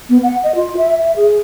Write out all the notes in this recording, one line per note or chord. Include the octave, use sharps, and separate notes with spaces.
B3
F#5
D#5
F4
E5
E5
G#4